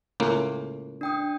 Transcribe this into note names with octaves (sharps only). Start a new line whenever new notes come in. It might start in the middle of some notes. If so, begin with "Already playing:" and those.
C#2 A2 A#3
D4 G5 D#6